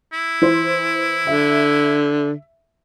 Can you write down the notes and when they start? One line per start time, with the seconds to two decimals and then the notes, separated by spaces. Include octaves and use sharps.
0.13 E4
0.42 E3 C5
1.27 D3 E5